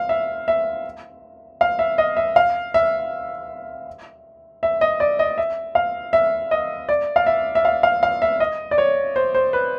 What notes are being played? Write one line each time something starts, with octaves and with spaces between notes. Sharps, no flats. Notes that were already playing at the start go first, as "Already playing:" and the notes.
Already playing: F5
E5
E5
F5
E5
D#5
E5
F5
E5
E5
D#5
D5
D#5
E5
F5
E5
D#5
D5
F5
E5
E5
F5
F5
F5
E5
D#5
D5
C#5
C5
C5
B4